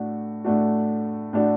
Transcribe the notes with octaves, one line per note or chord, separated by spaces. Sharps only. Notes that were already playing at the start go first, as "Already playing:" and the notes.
Already playing: A2 A3 D4 F#4
A2 A3 D4 F#4
A2 A3 D4 F#4